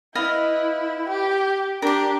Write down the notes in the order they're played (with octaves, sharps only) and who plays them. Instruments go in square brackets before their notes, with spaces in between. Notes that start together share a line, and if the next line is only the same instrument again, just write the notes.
[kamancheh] E4 [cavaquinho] B4 D#5 F5
[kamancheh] G4
[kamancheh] D4 G4 [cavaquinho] A#4 D6